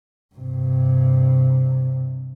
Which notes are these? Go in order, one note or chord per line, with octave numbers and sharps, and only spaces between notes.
G2 C3